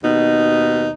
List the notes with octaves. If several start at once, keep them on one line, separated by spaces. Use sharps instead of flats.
D#2 B2 D#4